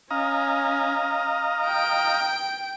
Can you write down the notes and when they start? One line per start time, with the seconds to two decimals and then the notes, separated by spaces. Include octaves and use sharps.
0.11 C#4 D#5 F5 A#5
1.66 G5 D7